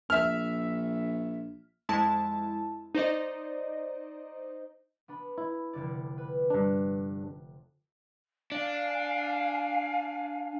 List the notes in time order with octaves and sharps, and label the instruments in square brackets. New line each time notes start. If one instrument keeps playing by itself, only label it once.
[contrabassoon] A#1 [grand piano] E5 F6
[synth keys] F2 G#3 E4 A5
D#4 C5 D5 D#5
[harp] B3 D4 B5
[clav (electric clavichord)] E4
[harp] F1 D3 D5
B4
[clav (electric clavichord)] G2 D4 [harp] A#5
[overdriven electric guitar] D4 [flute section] F5 G#5